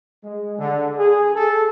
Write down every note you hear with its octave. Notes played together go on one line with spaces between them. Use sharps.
G#3
D3
G#4
A4